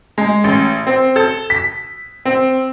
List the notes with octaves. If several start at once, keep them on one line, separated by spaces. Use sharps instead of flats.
G#3
A1
C4
A4
B6
C4